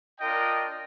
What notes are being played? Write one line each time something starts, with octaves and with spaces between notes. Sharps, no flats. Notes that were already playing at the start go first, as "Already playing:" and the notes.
D4 F4 A#4 D#5 G5